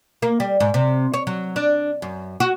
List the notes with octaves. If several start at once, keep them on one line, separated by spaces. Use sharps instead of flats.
A#3
G3
G#2
C3
C#5
F#3
D4
F#2
F#4